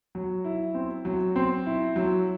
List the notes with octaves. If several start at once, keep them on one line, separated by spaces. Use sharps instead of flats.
F#3
E4
C4
F#3
C4
E4
F#3